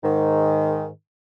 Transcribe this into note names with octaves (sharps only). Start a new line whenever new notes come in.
G#2 D#3